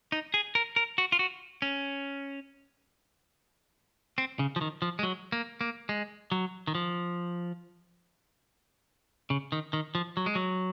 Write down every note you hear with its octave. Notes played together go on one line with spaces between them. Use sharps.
D#4
G#4
A#4
A#4
F#4
F4
F#4
C#4
C4
C#3
F3
D#3
F3
G#3
F#3
A#3
A#3
G#3
F#3
D#3
F3
C#3
D#3
D#3
F3
F#3
G#3
F#3